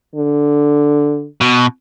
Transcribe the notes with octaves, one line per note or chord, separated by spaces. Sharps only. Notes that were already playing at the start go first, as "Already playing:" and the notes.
D3
B2